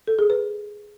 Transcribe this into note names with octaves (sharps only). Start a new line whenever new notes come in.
A4
G#4
B4